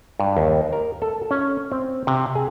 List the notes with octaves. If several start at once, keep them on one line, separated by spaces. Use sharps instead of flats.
G2
D#2
A#4
A4
C#4
C4
C3
G#4